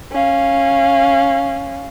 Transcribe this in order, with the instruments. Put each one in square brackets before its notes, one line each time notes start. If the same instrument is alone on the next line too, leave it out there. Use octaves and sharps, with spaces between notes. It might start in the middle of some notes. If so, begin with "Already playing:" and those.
[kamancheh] C#4 F5